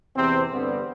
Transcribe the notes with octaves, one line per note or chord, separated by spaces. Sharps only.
E2 C3 E3 C4
G2 D3 G3 B3 C4